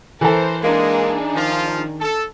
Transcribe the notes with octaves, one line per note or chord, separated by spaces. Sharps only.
E3 A4 A#4 C5
G#3 A#3 D4 D#4 G#4
D#3 F3 F4
A4